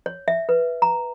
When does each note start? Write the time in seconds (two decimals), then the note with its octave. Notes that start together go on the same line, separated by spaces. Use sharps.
0.06 C#5
0.28 E5
0.49 B4
0.82 A#5